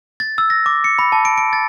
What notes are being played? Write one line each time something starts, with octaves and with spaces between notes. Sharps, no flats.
A6
E6
A#6
D6
C#7
B5
A5
D7
D7
A6